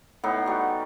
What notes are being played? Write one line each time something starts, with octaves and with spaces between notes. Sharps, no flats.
A2 B3 D#4
G3 F#4